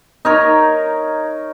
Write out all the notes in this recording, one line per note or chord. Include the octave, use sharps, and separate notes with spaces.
D#4 A#4 C#5